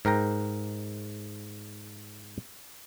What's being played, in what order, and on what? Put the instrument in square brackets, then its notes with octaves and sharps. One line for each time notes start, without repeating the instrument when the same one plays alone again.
[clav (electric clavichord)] G#2 A#4 G5 A#5